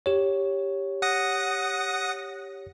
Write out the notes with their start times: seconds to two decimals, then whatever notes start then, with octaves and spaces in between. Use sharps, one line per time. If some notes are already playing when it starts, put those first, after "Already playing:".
0.06 G4 C#5
1.02 F#5 D#6 A#6